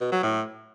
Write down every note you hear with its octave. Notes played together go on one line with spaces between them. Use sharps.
B2
F#3
A2